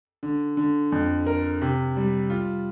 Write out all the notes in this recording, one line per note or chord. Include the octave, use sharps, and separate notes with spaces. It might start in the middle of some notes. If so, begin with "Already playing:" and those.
D3
D3
F2
A#4
C3
G3
F4